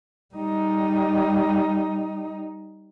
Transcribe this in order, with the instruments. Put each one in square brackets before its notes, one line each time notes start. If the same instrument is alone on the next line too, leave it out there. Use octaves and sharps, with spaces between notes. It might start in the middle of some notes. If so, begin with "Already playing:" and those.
[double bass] G3 D#4